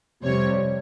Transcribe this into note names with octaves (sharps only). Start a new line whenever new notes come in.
F2 C3 G3 C#5